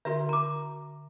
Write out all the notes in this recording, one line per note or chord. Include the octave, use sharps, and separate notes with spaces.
D3 F#4 A#4 E5
A#5 D6